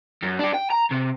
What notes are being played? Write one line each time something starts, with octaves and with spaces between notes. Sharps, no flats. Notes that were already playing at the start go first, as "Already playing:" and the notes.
F#2
D4 G4
G5
A#5
C3